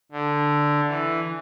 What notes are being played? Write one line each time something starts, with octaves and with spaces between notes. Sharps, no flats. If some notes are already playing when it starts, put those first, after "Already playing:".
D3
E3